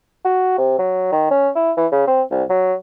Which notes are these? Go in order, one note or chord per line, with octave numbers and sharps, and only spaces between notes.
F#4
C3
F#3
D#3
C#4
E4
E3
C#3
C4
C2
F#3